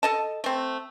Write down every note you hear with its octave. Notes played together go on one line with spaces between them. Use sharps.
A4 D#5 A5
A3 C4